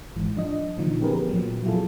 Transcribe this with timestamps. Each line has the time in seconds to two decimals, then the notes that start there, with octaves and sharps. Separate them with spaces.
0.16 G#1 G#2 E3
0.36 F3 D4 D#5
0.78 A#2 D3 E3 F3 D#4
1.01 B3 C#4 G4 G#4 A#4 B4
1.29 A#2 F3 F#3
1.64 B2 F#3 E4 F4 G#4 A4